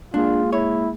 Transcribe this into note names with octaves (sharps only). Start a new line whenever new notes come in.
G#3 A#3 D4 F4 G#4
E4 C#5